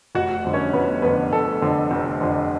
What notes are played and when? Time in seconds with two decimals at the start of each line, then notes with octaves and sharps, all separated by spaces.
0.15 F1 F#4 F#5
0.44 F2 D3
0.53 C#4 C#5
0.73 F1 B3 B4
1.02 F2 D3 B3 B4
1.33 F1 A4
1.62 F2 D3
1.91 F1
2.21 F2 D3